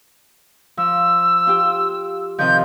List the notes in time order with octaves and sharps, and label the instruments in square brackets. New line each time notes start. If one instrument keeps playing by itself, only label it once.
[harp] F3 [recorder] E6
[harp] F4 G4
[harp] C3 D#3 F3 [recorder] G6